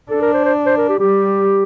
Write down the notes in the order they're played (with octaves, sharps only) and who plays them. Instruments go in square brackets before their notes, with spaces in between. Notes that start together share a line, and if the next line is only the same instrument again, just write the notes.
[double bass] D4 [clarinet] A4
[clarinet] A#4
C5
C5
C5
A#4
G4
[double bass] G3 [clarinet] G4